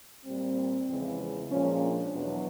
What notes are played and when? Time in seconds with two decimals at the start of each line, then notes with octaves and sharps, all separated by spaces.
0.25 A#2 G3 C4
0.88 E2 C#3 F3 G#3
1.49 A#2 F3 G#3 C#4
1.82 D4
2.12 E2 B2 F#3